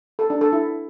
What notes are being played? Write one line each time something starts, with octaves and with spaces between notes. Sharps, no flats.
A4
D4
A4
E4